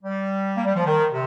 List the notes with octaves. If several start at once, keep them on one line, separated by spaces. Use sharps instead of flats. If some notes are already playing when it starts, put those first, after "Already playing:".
G3
A#3
G3
F3
D#3
C3